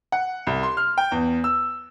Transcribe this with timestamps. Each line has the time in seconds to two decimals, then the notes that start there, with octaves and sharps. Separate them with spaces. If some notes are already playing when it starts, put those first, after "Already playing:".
0.12 F#5
0.47 C2
0.63 C6
0.77 F6
0.98 G5
1.12 E2
1.44 E6